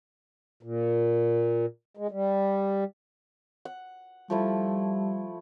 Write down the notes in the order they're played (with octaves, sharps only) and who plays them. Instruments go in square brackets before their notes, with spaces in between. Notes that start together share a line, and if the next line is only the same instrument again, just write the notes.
[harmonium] A#2
G#3
G3
[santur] F#5
[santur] F3 A3 E4 [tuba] G3